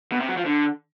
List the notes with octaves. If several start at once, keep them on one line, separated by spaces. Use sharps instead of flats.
B2
C3
F#3
F3
D3